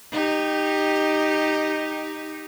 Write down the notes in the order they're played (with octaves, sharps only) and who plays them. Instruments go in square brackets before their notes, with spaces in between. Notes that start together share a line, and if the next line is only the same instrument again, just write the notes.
[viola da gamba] D#4 G4